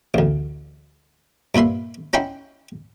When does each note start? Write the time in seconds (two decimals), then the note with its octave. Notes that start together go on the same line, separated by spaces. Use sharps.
0.14 A1 D2
1.55 G2 A#2 B4 E5 C6
2.13 C#4 D#4 E4 F#5 G5 C6